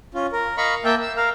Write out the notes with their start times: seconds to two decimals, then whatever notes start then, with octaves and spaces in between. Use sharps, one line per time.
0.14 C#4 F4
0.32 A#4
0.57 D#5 F5 A#5 B5 C#6
0.84 A#3 E5 G5 A5
1.02 E6
1.17 A#4 F5 F6